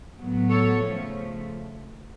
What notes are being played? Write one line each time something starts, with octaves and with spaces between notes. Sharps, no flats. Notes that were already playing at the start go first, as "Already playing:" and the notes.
A2 F#3 B3
A4 C#5
C#3 F3 A3